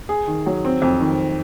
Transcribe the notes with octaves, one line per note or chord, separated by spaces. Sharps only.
G#4
D#3
F#3
C4
F2
D#3